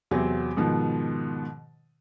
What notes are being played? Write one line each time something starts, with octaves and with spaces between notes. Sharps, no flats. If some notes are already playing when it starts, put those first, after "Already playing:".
E2 C3 F#3 C4
G#2 B2 D#3 F3